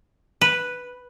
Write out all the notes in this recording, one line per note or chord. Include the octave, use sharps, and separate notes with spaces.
B4